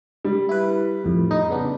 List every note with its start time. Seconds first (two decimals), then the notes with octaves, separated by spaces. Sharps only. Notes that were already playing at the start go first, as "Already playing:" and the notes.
0.25 G3
0.49 E4 B4
1.04 F2 A2
1.31 D#4
1.50 C#3 B3 D4